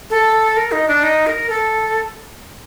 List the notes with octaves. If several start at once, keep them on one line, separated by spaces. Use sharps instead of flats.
A4
A#4
D#4
D4
D#4
A#4
A4